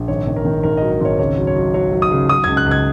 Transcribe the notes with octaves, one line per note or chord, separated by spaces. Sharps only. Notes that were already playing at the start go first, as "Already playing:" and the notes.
Already playing: A#1
G#1 C#5
D#3
A#4
D#3
G#1 A#4
D#5
F#3
A#4
G#1 C#5
C#2 C#5
F#3
C#5
F#3
F#3 C#5
F#3
D#6
C#3
F#3 D#6
C#2 G#6
F#6
C#2
G#6